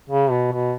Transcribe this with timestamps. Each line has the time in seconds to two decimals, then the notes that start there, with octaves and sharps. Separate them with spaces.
0.10 C#3
0.31 B2
0.52 B2